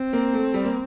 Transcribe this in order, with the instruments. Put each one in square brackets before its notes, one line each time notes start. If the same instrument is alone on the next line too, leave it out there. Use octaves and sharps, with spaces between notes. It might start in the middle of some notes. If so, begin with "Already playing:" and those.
Already playing: [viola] C4
[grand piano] A#3
A3
G3
A#3